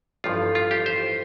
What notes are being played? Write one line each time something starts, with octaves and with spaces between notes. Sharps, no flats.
A1 G2 F3 F4
F4
G4
C5